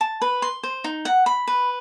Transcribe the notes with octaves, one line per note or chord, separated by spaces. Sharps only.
A5
B4
C6
C5
D#4
F#5
B5
B4